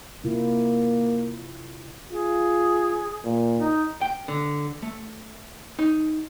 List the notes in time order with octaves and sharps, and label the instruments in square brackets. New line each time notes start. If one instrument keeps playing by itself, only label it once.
[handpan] C3 E4 F4 [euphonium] A#3
[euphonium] F4 [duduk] G#4
[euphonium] A#2
[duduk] D#4
[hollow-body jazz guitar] G5
D3
A3
D#4